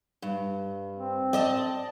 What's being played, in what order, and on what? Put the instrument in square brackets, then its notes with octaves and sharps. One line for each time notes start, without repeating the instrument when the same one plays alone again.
[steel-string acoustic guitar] G2
[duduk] C4
[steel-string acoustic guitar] D5 D#5 A5